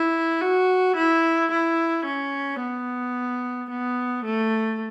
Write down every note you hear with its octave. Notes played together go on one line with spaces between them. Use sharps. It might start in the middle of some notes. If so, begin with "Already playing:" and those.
Already playing: E4
F#4
E4
E4
C#4
B3
B3
A3